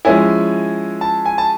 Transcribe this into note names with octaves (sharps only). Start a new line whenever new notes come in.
F3 G#3 C#4 E4 G#5
A5
G#5
A5